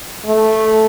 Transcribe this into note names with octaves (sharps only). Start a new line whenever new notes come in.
A3